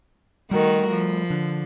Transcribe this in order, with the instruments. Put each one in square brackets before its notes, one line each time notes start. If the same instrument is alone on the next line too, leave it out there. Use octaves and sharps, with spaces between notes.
[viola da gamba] D#3 F#4 A#4 [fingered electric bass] G3 A3
[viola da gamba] F3
[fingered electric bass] D3